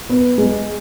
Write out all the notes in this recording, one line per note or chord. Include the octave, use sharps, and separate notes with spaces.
B3
G#3